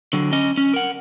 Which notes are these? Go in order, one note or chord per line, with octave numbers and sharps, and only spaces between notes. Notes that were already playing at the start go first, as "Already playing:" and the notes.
D3 F#3
C#4 D#5
C#4
A#4 F#5